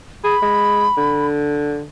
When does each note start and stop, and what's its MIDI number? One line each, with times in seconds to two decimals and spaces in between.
0.24 0.36 68
0.24 1.26 83
0.42 0.87 56
0.97 1.85 50